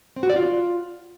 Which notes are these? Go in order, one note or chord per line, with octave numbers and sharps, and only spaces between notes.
C4
F#4
D5
F4